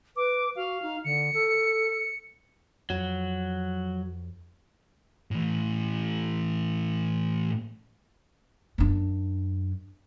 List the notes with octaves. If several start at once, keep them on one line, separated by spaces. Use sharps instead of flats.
B4 D6
F#4 F5
D#4
D3 C#7
A4
F2 F#3
A2 E3
F#2 D4